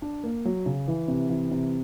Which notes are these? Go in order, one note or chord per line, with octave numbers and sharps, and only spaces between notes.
D4
A#3
F#3
C#3
E3
C3
E3
C3